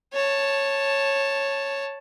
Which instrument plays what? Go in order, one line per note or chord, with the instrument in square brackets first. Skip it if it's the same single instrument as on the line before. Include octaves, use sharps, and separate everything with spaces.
[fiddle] C#5 A5